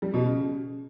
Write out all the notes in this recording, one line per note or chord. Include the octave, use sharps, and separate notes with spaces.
G3
B2
C#3